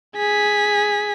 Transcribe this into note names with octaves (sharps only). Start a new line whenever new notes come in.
G#4 B6